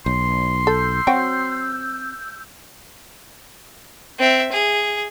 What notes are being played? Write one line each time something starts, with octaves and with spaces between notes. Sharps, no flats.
B1 C#5 C6
A4 E6 G6
F#3 C4 F#4 G5
C4 E5
G#4